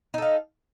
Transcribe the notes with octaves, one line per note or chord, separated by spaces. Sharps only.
D#4 A4 F5